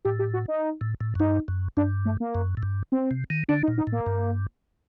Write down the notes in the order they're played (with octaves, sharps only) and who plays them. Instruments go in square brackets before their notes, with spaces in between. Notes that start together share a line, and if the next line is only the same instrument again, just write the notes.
[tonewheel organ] A2 [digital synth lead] G4
[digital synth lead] G4
F#4
D#4
[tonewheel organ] A2
A2
F#2
[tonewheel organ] G2 [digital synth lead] D#4
[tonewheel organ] F#2
[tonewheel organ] G2 [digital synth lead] D4
[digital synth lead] A3
A#3
[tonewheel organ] F#2
A2
G2
[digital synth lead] C4
[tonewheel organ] C3
D#3
[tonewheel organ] D3 [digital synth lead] D4
[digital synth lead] D#4
[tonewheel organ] A#2
[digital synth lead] D#4
[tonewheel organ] A2
[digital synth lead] A#3
[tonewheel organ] G2